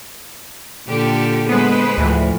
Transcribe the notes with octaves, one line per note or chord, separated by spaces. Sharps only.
A#2 D3 G4 A4
G#3 B3 B4 C5
D2 A2 E3 F3